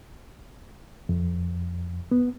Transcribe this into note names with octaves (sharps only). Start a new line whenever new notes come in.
F2
B3